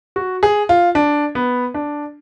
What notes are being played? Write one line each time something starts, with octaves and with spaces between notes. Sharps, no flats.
F#4
G#4
F4
D4
B3
D4